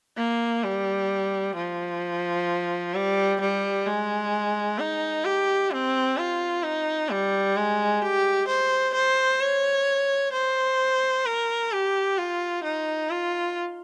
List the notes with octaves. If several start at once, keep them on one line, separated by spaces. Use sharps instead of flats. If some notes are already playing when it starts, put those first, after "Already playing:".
A#3
G3
F3
G3
G3
G#3
D#4
G4
C4
F4
D#4
G3
G#3
G4
C5
C5
C#5
C5
A#4
G4
F4
D#4
F4